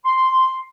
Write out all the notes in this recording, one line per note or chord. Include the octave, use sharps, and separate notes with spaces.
C6